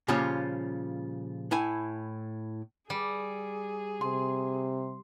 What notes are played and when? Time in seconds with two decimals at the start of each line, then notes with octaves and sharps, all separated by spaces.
0.08 A#2 C#3 F3 G3 C#4 F4
1.51 A2 E4 G#5
2.90 G3 G#4
4.01 C3 C6